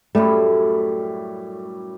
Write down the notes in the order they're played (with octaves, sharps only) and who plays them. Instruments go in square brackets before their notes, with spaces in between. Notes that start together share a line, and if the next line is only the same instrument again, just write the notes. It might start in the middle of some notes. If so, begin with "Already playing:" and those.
[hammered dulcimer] F#2 A2 G3 [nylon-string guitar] A3